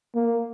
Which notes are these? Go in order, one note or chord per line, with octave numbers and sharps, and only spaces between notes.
A#3